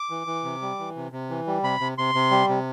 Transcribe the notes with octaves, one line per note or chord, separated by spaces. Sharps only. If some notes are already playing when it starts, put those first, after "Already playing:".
Already playing: D6
E3
E3
C3
G3
E3
C3
C3
E3
G3
C3 B5
C3
C3 C6
C3
G3
C3